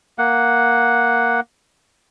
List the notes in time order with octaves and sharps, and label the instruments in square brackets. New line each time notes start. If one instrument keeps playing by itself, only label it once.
[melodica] A#3 F#5